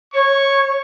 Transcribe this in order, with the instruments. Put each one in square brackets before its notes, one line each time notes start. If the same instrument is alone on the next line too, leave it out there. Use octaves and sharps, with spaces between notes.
[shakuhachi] C#5 [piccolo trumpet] C#6